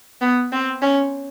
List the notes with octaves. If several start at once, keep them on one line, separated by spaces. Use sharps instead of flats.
B3
C4
C#4